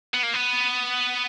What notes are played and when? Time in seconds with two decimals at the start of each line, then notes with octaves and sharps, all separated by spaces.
0.14 B3
0.23 A#3
0.34 B3